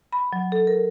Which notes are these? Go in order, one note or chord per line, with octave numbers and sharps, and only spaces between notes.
B5
F#3
A4
A#4